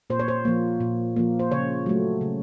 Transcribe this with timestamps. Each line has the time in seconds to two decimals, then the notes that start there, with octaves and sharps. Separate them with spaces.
0.10 A#2 C5
0.19 C#5
0.28 C5
0.45 F3 A#3
0.80 A#2
1.16 F3 A#3
1.39 C5
1.51 C#3 C#5
1.86 F#3 A3
2.21 C#3